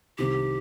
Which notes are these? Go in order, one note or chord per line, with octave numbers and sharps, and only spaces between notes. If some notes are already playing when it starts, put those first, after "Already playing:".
C2 C3 D#3 G4